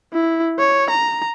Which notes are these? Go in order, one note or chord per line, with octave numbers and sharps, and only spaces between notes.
E4
C#5
A#5